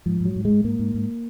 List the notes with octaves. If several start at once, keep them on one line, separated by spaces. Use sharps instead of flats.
G#2 F3
G#2 F#3
G#2
G#3
G#2
G#2 A#3
G#2
G#2